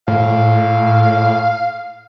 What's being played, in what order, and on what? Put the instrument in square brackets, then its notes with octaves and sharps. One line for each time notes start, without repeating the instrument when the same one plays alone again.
[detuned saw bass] A2 [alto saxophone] F5